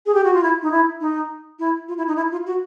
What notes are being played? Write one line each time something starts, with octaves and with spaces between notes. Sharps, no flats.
G#4
G4
F#4
F4
E4
D#4
E4
D#4
E4
F4
E4
D#4
E4
F4
F#4